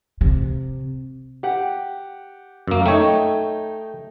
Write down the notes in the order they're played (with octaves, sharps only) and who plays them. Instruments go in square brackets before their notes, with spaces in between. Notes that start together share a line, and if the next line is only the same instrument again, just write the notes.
[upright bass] C3
[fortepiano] G4 F#5
[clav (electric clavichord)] F#2 A#3
[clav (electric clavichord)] A3 C#5 [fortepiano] D#4 G5